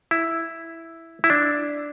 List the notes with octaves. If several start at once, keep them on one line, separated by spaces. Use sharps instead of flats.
E4
E4
D4